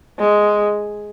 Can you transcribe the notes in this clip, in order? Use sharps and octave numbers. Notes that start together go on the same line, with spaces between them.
G#3